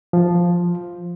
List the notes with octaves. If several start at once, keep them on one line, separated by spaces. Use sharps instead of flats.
F3